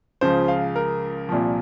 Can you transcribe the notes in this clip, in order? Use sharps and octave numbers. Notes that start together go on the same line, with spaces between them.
C#2 C#3 F3 C5
F5
A#4
C2 A#2 F3